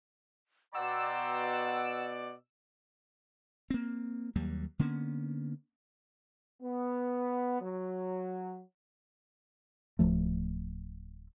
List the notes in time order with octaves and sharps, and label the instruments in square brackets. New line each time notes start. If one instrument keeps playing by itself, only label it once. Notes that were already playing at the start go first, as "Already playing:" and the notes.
[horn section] B2 D5 [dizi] F#5 [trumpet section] G5 A#5 C6 [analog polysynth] E6
[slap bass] A#3 C4
D#2 F#3 G3 A#3
D3 A#3 B3 C#4
[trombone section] B3
F#3
[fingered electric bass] D1 C#2 F3 A3